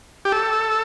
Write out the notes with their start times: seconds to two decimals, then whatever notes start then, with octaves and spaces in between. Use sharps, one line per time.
0.25 G4
0.32 A4